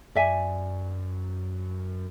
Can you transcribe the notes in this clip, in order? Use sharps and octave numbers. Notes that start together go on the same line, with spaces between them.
F#2 D5 E5 G#5